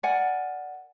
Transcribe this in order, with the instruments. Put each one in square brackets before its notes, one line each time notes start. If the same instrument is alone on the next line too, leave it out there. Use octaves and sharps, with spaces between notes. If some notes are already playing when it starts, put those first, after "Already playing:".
[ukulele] A#4 D5 F#5 G#5